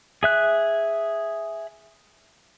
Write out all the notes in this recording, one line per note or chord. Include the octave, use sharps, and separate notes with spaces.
G#4 E5 F#6